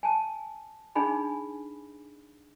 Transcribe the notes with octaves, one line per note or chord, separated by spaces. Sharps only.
G#5 A5
D4 D#4 G#4 G#5 B5